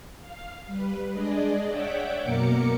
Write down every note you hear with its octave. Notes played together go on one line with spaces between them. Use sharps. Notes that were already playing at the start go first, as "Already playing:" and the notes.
F5
G3 B4
G#3 D4 G#4 D5 D#5
C#5 D5 E5 F#5 G5 D6
F#2 B2 A#3 A#4 D6 C#7